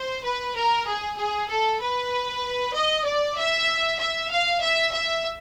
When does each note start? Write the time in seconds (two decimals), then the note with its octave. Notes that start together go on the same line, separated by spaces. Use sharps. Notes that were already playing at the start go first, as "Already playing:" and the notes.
Already playing: C5
0.24 B4
0.56 A#4
0.87 G#4
1.18 G#4
1.50 A4
1.81 B4
2.75 D#5
3.06 D5
3.38 E5
3.99 E5
4.31 F5
4.62 E5
4.93 E5